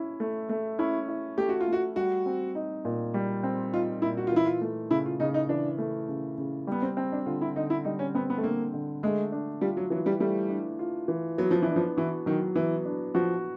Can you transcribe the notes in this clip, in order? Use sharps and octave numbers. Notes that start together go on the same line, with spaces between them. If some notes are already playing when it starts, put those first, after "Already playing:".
Already playing: C#4 E4
A3
A3
C#4 E4
E4
A3 G4
F#4
F4
A3
F#4
G3 F#4
C4
D#4
A#2
G3
C4
D#4 F4
A#2 E4
F#4
F4
E3 E4
F4
A3
C#3 E4
F4
C#3 D#4
D#4
E3 D4
A3
C#3
C#3
G3 B3
C4
C4
D4
D3 F4
E4
D3 D#4
E4
G3 D#4
C#4
B3 C4
B3
A3
D3 A#3
D3
G#3 A3
D4
G3 F4
F#3
E3 F#3
G3
G3 A3
D4
F4
E3
F#3 B3
F3
E3
D4
F3
E3 F#4
D#3 F#3
E3 B3
D4
F3 F#4